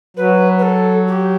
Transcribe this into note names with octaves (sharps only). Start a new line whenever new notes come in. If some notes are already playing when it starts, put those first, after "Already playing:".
F#3 B4
B4
A4
G4